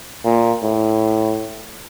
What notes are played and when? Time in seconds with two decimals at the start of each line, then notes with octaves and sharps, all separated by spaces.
0.25 A#2
0.63 A2